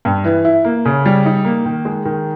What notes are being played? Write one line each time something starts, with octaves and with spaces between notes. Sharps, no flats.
G2
E3
E4
A#3
C#3
G3
D#4
A#3
D#3
G#3
D#3